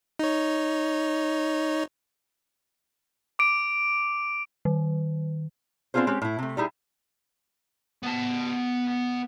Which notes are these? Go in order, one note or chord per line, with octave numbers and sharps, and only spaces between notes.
D#4 C#5
D6 D7
D#3
B3 C4 D4 F4 G#4 C5
G#3 C4 C#4 G4
A2 E4
C3 A3
G3 D#4 E4 G#4
B3 A5